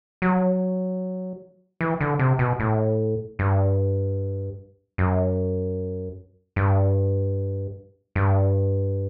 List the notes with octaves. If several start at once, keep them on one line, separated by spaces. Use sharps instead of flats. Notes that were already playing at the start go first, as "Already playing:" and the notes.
F#3
E3
D3
C3
B2
A2
G2
F#2
G2
G2